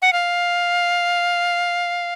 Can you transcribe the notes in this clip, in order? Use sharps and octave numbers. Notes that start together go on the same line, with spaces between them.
F#5
F5